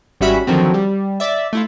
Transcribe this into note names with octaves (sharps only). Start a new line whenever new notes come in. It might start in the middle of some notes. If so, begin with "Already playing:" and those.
G#1 G3 C#4 F#4 E5 B5
D3 D#3 F3 F#3 C4
G3
D5 E5
A3 E4 F4